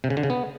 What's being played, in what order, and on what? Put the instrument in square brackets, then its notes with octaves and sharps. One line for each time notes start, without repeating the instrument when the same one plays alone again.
[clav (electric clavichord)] C3
C#3
D3
C#3
B3